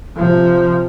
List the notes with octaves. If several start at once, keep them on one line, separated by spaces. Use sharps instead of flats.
C3 F3